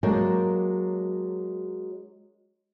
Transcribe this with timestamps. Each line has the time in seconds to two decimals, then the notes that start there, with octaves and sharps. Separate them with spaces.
0.03 F#3 G#3 A#3 D4 A#4 G5